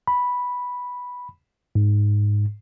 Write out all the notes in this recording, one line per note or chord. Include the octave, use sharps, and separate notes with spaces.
B5
G#2